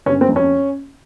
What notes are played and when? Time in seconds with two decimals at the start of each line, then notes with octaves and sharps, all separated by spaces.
0.06 G1 C#4
0.21 C4
0.29 F2
0.36 C#4